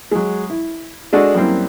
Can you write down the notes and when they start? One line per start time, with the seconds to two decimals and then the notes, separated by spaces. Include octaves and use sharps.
0.11 F#3 G#3
0.50 E4
1.13 G#3 D4 F#4 A4 D#5
1.35 F#2 G3 A#3 C4 E4